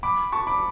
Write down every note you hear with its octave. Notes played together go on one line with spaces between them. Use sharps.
B5 D6
A5 C#6
B5 D6